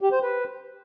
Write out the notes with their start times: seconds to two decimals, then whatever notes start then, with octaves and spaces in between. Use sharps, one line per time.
0.01 G4
0.12 C5
0.23 B4